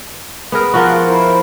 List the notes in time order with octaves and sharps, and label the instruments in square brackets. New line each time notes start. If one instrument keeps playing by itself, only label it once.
[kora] B3 G#4 A#4
[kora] F3 F#4 [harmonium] F4 A#4 F#5
[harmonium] E4 A#4 C5